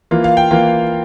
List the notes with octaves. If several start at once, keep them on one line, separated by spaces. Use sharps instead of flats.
E3 A#3 F4
F5
G5
E3 A#3 F4